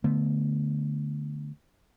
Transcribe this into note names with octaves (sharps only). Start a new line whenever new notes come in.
D3 A3 B3